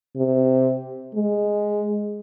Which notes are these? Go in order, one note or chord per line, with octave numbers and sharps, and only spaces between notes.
C3
G#3